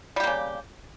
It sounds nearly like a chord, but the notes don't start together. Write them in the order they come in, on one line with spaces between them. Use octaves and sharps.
G3 G4 A#3 C#3